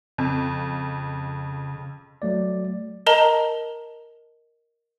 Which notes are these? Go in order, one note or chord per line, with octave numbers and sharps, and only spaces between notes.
F2 C#3
F#3 A3 D5
A#4 D#5 A5 A#5 G7